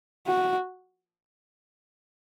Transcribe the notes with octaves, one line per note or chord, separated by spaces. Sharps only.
F#4